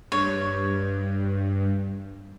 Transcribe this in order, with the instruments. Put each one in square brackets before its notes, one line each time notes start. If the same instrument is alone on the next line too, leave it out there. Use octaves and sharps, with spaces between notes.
[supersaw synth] G2 [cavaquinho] C#5